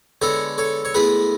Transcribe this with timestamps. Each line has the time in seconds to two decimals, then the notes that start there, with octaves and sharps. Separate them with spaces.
0.22 D3 G#3 B3 A4 C#5
0.58 A4 C#5
0.85 C#5
0.94 A2 G#3 B3 G#4 B4